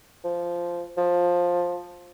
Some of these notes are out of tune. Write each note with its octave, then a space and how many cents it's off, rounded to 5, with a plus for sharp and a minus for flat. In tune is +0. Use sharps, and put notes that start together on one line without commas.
F3 -10
F3 +10